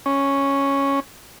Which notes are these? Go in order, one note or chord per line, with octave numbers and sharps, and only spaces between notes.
C#4